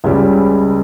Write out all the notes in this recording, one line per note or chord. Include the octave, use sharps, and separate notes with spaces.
C#2 C#3 G3